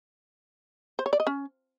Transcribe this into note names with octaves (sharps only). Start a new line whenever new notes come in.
C5
C#5
D5
D#5
C#4